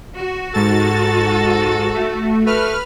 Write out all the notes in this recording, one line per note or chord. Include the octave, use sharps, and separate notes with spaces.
F#4
G#2 A4 A6
A3
A3 B4 F6